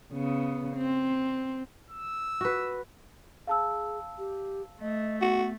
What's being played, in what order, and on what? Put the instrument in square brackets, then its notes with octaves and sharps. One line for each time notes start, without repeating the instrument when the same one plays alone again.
[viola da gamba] C#3 B3
C4
[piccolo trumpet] E6
[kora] F#4 B4
[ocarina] G#4 [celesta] F5 A5 E6
[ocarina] G4
[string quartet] A3 [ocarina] D#5
[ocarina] B3 [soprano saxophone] F#4